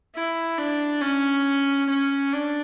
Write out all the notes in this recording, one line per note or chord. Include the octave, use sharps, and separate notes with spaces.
E4
D4
C#4
C#4
D4